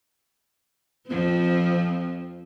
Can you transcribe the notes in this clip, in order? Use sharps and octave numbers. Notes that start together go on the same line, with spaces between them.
F2 F3 C4